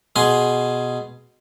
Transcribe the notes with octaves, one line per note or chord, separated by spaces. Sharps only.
B2 G#4 C6